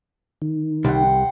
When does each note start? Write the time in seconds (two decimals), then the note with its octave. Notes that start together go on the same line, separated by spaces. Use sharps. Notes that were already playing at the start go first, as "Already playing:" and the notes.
0.42 D#3
0.85 C2 F#5 G5 C6